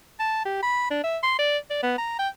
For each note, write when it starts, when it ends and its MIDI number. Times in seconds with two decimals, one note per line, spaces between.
0.20 0.41 81
0.45 0.59 67
0.63 0.87 83
0.91 1.00 62
1.04 1.18 76
1.23 1.34 84
1.39 1.58 74
1.70 1.79 74
1.83 1.94 59
1.98 2.17 82
2.19 2.29 79